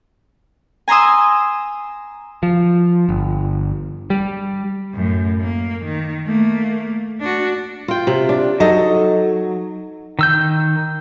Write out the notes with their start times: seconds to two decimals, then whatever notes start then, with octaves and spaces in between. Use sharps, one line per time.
0.88 G#5 A#5 C6 D#6 E6
2.43 F3
3.09 G1
4.10 G3
4.94 F#2 A2
5.41 A#3
5.85 D#3
6.26 A3 A#3
7.21 D4 F#4
7.88 F4 G5
8.07 C3
8.29 D4
8.60 F#3 D#4 A4 D#5
10.19 D#3 E6 G6